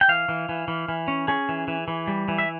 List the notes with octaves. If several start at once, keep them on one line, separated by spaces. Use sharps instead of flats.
G5
E3 F5
E3
E3
E3
E3
C#4
C#4 G#4
E3
E3
E3
G3
E3
E5